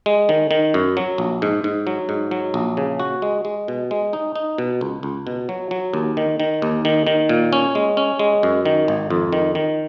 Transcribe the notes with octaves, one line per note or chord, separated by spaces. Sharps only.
G#3
D#3
D#3
F#2
F#3
A#1
G#2
G#2
F#3
G#2
F#3
A#1
C#3
F#4
G#3
G#3
B2
G#3
D#4
D#4
B2
C#2
C#2
B2
F#3
F#3
D#2
D#3
D#3
D#2
D#3
D#3
A#2
C#4
G#3
C#4
G#3
F#2
D#3
G#1
F2
D#3
D#3